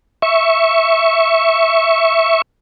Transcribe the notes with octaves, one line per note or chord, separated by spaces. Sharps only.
E5 C#6